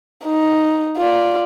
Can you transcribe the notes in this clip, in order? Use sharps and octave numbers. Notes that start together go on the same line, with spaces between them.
D#4
F4 D5